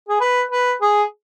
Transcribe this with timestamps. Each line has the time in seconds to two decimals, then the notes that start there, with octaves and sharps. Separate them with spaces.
0.09 G#4
0.20 B4
0.51 B4
0.81 G#4